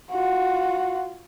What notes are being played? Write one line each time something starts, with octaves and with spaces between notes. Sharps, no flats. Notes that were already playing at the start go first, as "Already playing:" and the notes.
F4 F#4